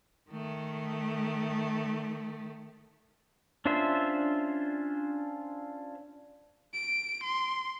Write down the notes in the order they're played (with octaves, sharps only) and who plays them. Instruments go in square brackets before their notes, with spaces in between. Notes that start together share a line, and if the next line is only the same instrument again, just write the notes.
[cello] D#3 A3
[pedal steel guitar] C#4 D4 F4 C5 E5
[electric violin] D7
C6